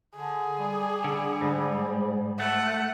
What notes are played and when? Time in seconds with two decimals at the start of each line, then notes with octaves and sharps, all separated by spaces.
0.16 D3 G#4
0.59 G3
1.04 D3
1.41 G#2
2.40 A3 F#5